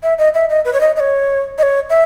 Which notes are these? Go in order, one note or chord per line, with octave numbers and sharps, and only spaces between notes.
E5
D#5
E5
D#5
B4
C#5
D#5
D#5
C#5
D#5
C#5
E5